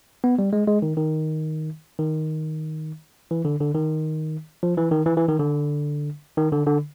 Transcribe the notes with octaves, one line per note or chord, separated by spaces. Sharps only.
B3
G3
G#3
G#3
D#3
D#3
D#3
E3
D3
D3
D#3
F3
E3
D#3
E3
E3
D#3
D3
D#3
D3
D3